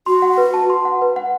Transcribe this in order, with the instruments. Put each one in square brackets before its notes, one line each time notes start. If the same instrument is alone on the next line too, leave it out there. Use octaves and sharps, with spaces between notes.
[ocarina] F#4 [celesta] C6
[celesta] F#5
B4
A5
C6
F#5
B4
F#5